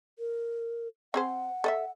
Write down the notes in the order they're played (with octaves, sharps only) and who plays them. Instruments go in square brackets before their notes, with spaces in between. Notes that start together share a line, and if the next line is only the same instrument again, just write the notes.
[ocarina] A#4
[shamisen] C4 G#4 C5 [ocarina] F#5
[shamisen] A4 D#5 E5